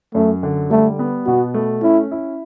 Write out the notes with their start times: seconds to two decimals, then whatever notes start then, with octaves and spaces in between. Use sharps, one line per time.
0.14 F#2 A3
0.43 D3
0.70 G3 A3
0.99 B3
1.26 B2 F#4
1.54 A3
1.82 C#4 E4
2.11 E4